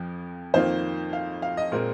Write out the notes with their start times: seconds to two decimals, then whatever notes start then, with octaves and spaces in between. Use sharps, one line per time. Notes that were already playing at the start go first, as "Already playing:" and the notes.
Already playing: F2 F3
0.54 F2 D#3 A#3 F4 C5
1.13 F5
1.42 F5
1.57 D#5
1.72 A#2 G#3 C4 A#4